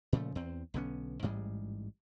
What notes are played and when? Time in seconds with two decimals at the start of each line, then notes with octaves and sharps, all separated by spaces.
0.13 A#2 C#3 F3 A3
0.35 E2 C4
0.74 B1 D3 B3 C#4
1.23 A1 G#2 G3 G#3